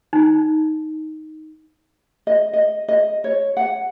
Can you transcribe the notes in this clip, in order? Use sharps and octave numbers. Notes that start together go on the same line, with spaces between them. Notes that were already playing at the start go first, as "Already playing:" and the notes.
D#4
D#5
D#5
D#5
C#5
F#5